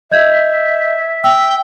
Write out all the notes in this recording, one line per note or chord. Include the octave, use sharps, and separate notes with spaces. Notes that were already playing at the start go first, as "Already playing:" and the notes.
D#5 E5 G6 G#6
G5 E6